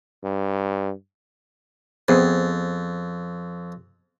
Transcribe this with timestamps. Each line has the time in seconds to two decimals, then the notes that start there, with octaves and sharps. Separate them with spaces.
0.24 G2
2.08 F2 B3 C4 G#4